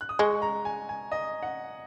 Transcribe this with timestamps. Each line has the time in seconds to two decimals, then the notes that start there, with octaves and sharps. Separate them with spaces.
0.01 F#6
0.09 D#6
0.19 G#3 C#6
0.42 A#5
0.65 G#5
0.89 G#5
1.12 D#5
1.43 F#5